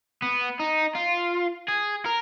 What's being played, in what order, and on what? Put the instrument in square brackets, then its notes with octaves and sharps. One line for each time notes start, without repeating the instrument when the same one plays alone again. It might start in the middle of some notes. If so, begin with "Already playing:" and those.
[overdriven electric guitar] B3
D#4
F4
G#4
A#4